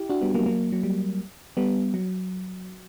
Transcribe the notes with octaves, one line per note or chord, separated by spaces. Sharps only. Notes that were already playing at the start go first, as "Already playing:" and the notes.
Already playing: E4 G4
D4 F#4
G3 B3
F#3 A#3
F#3 A#3
F#3
G3
G3 B3
F#3